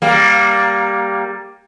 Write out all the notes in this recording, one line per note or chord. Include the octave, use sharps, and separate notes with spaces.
G3 A#3